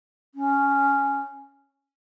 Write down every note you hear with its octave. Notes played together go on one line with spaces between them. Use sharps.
C#4